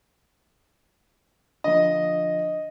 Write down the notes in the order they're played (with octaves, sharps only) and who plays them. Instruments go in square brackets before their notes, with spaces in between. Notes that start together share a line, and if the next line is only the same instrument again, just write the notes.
[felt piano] D3 F3 [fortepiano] D#5